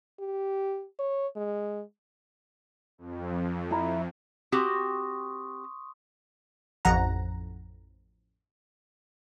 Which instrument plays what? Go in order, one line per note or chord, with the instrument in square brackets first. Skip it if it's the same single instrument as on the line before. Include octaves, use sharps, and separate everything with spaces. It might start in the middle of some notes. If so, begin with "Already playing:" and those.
[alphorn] G4
C#5
G#3
[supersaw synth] F2
[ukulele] E4 A#5 B5
[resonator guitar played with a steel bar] C4 F#4 G4 [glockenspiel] C6 C#6 D#6
[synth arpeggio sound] A1 F2 F#5 A#5